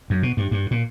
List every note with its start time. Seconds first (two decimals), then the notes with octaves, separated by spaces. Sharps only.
0.10 F#2
0.23 B2
0.37 G2
0.51 G2
0.71 A#2